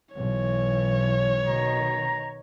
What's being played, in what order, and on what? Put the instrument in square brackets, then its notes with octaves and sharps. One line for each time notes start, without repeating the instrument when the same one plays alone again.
[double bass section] B1 [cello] E3 [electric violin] C#5
[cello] B2 D#3 [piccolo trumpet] A#5